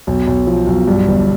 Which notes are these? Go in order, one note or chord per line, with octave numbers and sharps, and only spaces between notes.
B1
B1
F3
B1
G2
G1